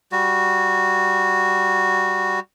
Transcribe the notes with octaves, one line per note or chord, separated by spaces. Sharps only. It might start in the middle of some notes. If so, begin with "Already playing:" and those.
G3 F#4